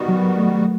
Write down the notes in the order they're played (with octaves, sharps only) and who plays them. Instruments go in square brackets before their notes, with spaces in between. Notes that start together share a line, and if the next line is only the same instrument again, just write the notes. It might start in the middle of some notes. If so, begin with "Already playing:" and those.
Already playing: [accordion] D#3 G3 B3 F#4
[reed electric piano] F#3
A3